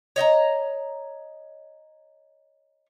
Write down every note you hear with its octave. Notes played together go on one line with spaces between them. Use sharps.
C#5 D#5 G5 A#5